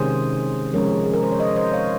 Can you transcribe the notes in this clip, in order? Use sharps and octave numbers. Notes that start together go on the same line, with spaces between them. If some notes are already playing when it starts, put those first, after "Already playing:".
Already playing: C3 D#3 G#3 C#4 G#4 C5
F3 G#3 C#4 A#4 C#5
G#4
A#4
C5
C#5
C5 D#5
C5 D#5
C#5 F5